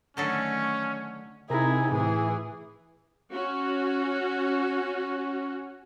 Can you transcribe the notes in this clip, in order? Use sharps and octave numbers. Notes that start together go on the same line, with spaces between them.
D3 D#3 F#3 A3 C#4 A4 C#5
C3 D#4 E4 G#4 A#4 A#5
A2 E3 G#4
C#4 F#4